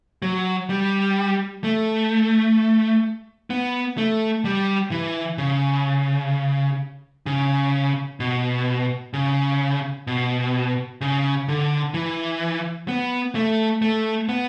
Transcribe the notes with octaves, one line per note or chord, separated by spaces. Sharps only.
F#3
G3
A3
B3
A3
G3
E3
C#3
C#3
B2
C#3
B2
C#3
D3
E3
B3
A3
A3
B3